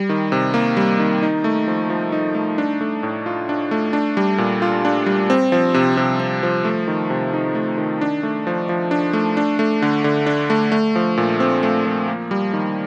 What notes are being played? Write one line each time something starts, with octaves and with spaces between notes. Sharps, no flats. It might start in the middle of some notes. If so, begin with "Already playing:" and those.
Already playing: G3
D#3
C3
A#3
G3
D#3
D#4
A3
F3
F3
D#4
A3
D4
A3
A2
F4
D4
A3
D4
G3
A#2
F4
D4
G3
C4
F3
C3
C3
C4
F3
A3
D#3
C3
D#4
A3
D#3
D4
A3
F3
F3
D4
A3
D4
A3
D3
D3
D4
A3
A3
F3
A#2
C4
A3
F3
A#3
G3
D#3